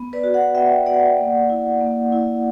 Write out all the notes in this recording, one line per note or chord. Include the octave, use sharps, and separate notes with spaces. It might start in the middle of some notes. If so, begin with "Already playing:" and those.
Already playing: B3
B4 D5
F#4
D5 F#5
B3 E5 G5
F#4 D5 F#5
A#3
E4
A#3
E4